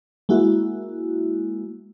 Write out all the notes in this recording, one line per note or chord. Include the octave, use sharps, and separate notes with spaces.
G#3 A#3 E4 F#4